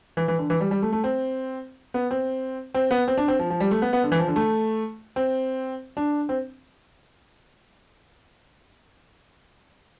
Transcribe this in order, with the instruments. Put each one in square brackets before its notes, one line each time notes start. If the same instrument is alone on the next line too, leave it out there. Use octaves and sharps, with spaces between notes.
[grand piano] E3
E3
D3
E3
G3
G3
A3
A3
C4
B3
C4
C4
B3
C4
D4
C4
F3
F3
G3
A3
B3
B3
D3
E3
F3
D3
A3
C4
D4
C4